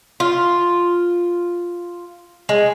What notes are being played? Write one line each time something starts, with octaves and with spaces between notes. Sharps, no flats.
F4
G#3